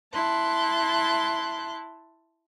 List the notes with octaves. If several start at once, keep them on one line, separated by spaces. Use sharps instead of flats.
E4 A5 C6 F#6